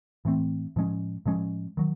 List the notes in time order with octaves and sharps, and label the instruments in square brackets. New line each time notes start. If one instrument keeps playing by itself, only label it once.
[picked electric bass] A2 E3 A3 C4
A2 F3 G#3 C#4
A2 F3 G#3 C#4
D#3 F#3